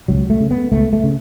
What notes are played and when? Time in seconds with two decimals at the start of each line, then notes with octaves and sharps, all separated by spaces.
0.08 C#2 F#3
0.30 A3
0.40 C#3
0.51 B3
0.72 C#2 A3
0.93 A3
1.04 C#3